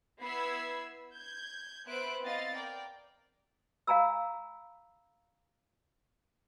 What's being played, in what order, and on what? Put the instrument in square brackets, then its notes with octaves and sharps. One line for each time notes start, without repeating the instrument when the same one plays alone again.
[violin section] B3 E4 B5 E6 G#6 C7
G6 G#6
B3 B4 C5 E5 F#6 D7
B3 C4 E4 D#5 F5 A6
A#4 D5 G5
[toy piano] F5 G#5 A#5 B5 E6